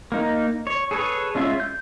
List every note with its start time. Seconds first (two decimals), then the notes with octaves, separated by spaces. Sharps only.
0.12 A#3 D#4
0.67 C#5
0.91 G#4 A4 B4 C#5
1.35 G#3 C#4 F4 E5
1.60 G6